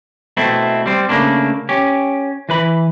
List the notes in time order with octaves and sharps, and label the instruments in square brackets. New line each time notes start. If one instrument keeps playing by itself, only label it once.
[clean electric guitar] B2 A3 C4 E4
G3 C4
C#3 A3 A#3 D4
C#4 G4
E3 B4 B5